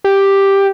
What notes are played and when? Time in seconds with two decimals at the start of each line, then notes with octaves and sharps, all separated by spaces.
0.04 G4